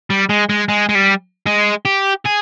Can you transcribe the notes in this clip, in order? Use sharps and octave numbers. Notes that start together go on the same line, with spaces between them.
G3
G#3
G#3
G#3
G#3
G3
G#3
G4
G#4